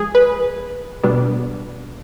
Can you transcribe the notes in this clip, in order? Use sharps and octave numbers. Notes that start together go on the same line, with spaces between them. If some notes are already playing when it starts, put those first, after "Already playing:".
Already playing: F3 G#3 G#4
B4
B2 G3 B3 D4